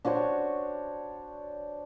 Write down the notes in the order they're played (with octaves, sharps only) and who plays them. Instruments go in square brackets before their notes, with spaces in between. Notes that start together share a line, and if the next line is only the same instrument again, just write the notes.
[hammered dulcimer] D4 F#4 C5 C#5